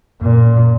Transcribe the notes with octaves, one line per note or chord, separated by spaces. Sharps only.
F#2 A#2